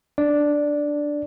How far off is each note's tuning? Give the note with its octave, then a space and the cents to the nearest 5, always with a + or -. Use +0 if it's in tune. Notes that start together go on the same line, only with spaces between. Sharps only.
D4 +0 D5 +0